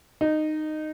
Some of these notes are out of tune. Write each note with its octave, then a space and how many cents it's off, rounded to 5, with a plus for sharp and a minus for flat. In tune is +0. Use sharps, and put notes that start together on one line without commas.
D#4 -15